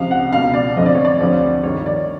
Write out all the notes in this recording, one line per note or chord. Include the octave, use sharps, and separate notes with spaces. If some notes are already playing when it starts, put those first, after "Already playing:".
Already playing: C#2 C3 F3 F5
F#5
C#2 B2 F5
D5
F2 D3 F3 D#5
D5
C#5
D5
D2 C3 F3
G2 D#3 C#5
D5